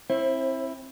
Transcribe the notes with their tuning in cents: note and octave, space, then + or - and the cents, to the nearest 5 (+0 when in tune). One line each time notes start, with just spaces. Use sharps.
C4 +20 E4 +0 C5 +40